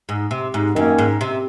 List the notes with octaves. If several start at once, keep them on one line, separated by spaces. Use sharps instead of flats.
G#2
C3
G#2
F#2 D#3 A#3 C#4
G#2
C3